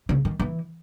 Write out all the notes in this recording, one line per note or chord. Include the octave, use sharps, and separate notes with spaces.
C#3
D#3
E3